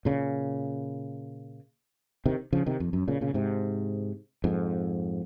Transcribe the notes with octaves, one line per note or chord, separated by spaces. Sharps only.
A#2 C#3
C3 D#3
C#3 F3
C3 D#3
F2
F#2
A#2 C#3
A#2 C#3
G#2 C3
F2 G#2